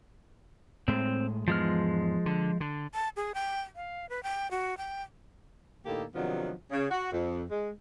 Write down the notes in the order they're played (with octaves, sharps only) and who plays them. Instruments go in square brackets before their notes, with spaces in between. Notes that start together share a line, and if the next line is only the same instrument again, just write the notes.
[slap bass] A2 G#3 [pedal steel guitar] C4
[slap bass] E2 G#2 [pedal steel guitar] F3 G#3 F6
[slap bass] D3
D3
[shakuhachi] A5
G#4
G5
F5
B4
G5
F#4
G5
[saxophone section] A2 D3 A#3 D#4 G4 A4
C3 D#3 F3 F#3 B3 D4
C#3
F#4
F2
G#3